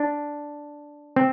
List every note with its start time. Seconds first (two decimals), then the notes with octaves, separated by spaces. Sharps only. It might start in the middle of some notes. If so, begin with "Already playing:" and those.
Already playing: D4
1.16 C4